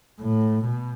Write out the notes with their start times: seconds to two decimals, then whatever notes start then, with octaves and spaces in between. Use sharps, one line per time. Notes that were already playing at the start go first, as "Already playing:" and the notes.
0.19 A2
0.64 B2